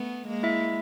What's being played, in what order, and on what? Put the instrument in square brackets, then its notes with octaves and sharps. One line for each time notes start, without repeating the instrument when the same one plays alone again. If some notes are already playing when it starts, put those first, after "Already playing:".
Already playing: [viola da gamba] A3 B3
G#3 A#3
[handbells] E4 E5